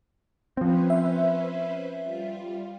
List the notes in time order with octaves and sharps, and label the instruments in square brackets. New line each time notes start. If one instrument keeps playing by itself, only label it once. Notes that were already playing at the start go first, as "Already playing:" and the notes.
[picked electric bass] F3 C4 [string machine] C#4 B4 C5
[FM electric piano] E5
[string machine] G3 F4